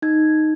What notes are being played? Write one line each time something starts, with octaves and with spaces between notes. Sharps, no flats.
D#4 G#6